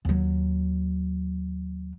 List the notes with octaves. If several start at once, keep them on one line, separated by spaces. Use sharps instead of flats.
D#2 F#3